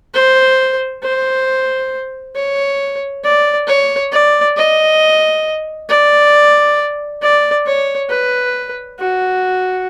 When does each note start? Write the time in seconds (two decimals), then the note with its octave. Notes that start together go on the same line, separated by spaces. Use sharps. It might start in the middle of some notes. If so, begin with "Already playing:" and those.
0.14 C5
1.03 C5
2.36 C#5
3.24 D5
3.67 C#5
4.12 D5
4.57 D#5
5.89 D5
7.22 D5
7.66 C#5
8.10 B4
8.99 F#4